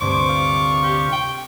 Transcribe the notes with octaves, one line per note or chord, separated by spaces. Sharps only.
D2 G2 C3 C5 C#6 D6
F4
G4
G5